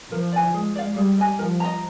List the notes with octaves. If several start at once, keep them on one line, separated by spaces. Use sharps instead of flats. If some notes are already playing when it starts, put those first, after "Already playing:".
F3 A#4
D5 G#5
G#3 G#4
D5 F5
G3 G#4
D#5 G#5
F3 A#4
D#5 A#5